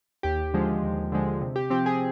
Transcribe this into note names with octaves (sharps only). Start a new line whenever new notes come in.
D#2 G4
D3 F3 G#3
D#2
D3 F3 G#3
C3
G4
F3 C4 G4
G#4